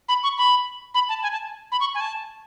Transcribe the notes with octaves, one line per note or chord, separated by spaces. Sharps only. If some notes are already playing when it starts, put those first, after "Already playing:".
B5
C#6
B5
B5
A5
G#5
A5
B5
C#6
G#5
A5